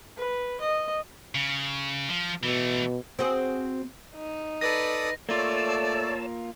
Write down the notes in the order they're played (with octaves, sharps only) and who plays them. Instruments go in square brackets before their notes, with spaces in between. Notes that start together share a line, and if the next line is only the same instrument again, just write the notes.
[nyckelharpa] B4
D#5
[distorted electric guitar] C#3
F3
[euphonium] B2 [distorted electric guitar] E3 A3
[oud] C4 F#4 G#4
[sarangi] D#4
[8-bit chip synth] A4 D5 D#6 [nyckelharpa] B4 [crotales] A#6
[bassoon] A3 [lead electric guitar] A#3 F4 [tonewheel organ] C#5 A5 E6 [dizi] D5